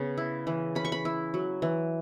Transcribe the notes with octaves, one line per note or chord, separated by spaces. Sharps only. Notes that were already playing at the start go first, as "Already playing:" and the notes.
Already playing: C#3 B3
E4
E3
C#4 B5
C#6
B5
E4
F#3
E3